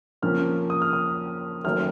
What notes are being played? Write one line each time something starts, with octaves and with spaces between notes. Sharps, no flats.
F2 C#3 F3 A#3 C#4 F6
D#6
F6
D#6
F#1 F#2 D#3 A3 F6